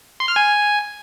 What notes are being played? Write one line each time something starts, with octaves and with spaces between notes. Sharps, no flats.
C6
F6
G#5